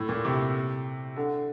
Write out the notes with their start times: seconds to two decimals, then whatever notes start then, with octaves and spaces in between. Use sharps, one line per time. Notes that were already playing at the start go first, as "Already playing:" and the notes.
Already playing: A2
0.09 A#2
0.25 C3
1.16 D3